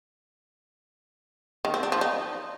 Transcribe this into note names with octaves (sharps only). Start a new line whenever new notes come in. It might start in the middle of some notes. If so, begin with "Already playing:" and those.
D#3
C4
D4
F3
D#4